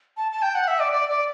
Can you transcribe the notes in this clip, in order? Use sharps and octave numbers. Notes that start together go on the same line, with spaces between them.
A5
A5
G5
F#5
E5
D5
D5
D5